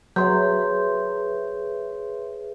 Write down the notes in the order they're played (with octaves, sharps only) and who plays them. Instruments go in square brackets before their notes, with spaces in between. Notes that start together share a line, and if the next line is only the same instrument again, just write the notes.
[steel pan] F#3 [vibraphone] G#4 B4 E5 [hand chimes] C#5 C6 G6